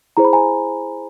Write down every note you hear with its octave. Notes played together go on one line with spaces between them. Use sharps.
E4 G#4 C5 A#5
B5
G#5 A#5